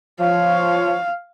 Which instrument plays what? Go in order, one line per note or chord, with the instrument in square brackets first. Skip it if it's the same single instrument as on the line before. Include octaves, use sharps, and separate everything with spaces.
[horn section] F3 C#5 [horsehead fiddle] F5